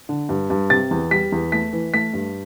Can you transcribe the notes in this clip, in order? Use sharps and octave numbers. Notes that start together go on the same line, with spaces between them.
D3
G2
G2
C3 A6
E2
G3 B6
E2
A3 B6
E3
A3 B6
G2